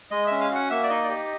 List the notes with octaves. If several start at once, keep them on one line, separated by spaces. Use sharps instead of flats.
G#3 D#5
C#4 E5
F5
F#4 F#5
A#3 E5
D5
D#4 D#5
D5
G4 D#5